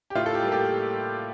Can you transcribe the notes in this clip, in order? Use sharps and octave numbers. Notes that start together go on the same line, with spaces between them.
G4
A2 F4
A4
G4
G3 A#3
G4